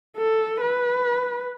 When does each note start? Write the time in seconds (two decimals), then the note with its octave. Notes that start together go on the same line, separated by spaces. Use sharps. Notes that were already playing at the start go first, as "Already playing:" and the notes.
0.17 A4
0.61 B4